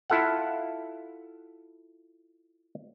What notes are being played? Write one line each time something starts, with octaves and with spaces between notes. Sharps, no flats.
E4 F4 A4 F5 F#5